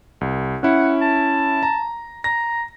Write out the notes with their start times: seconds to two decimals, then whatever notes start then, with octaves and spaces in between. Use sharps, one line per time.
0.21 C2
0.63 C#4 E4 F#5
1.01 A5
1.63 A#5
2.24 A#5 A#6